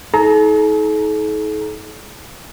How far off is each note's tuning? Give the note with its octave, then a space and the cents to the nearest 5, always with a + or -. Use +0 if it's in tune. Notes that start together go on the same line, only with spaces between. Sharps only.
D#4 +40 A4 -45 A#5 +0